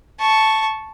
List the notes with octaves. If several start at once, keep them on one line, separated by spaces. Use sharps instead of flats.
A5 C#6